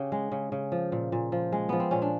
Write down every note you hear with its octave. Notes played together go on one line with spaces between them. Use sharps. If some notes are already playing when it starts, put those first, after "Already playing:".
Already playing: C#3 G4
G#3
C#3
C#3
F3
A#2
A#2
F3
G#3
F3 B3
C4
A#2 C#4
D4